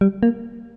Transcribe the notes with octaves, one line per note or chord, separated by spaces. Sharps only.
G3
A#3